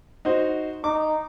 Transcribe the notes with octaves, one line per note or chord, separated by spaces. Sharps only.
D#4 F#4 C5
D#4 D6